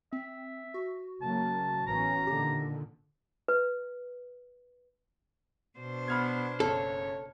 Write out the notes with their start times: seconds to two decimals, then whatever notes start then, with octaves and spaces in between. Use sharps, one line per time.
0.13 C4 E5
0.74 F#4
1.22 C#3 F#3 A#3 A5
1.87 A1 B3 C#4 A#5
2.27 A#2 D3 D#3 G4
3.48 B4
5.78 B2 D4 C5
6.08 B3 B5 F6 G#6
6.60 F#1 F#2 C#3 A4 C#5